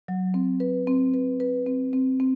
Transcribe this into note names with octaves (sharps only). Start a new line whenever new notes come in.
F#3
C4
B4
C4
B4
B4
C4
C4
C4